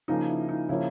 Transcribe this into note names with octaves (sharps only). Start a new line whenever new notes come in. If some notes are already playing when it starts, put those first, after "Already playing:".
C#3 F3 A#3 D#4
E4
D#4
C#3 F3 A#3 C#4 E4